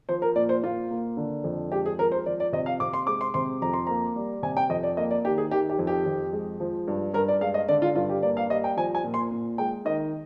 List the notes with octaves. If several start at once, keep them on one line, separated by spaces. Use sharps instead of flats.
F3 C5
A#4
A#2 D5
C5
A#2 F4
A#3
D3
F2
G#3 G4
G#4
F3 A#4
C5
F3 D5
D5
C3 D#5
F5
C3 D6
C6
G#3 D6
C6
C3 C6
F2 A#5
C6
A#3 A#5
G3
C3 G#5
G5
F2 D#5
D5
A#3 D#5
D5
D#3 G4
G#4
D#3 G4
G4
F2
G4
F2
G#3
F3
G2
G2 A#4
D5
G#3 F5
D#5
D3 D5
F4
G2 F4
G4
A#3 D5
F5
G3 D#5
G5
F3 G#5
G#5
A#2
C6
A#2
G#3 G5
D#3 D#5